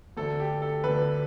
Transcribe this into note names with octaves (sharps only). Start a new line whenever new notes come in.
D2 D3 A4
G4
A4
D3 B4
D2